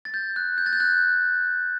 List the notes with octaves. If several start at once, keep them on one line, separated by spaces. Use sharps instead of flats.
A6
G6
F#6
G6
A6
G6
F#6